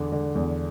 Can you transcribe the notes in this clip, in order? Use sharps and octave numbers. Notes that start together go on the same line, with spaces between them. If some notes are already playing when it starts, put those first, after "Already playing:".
Already playing: E2 D3
D3
E2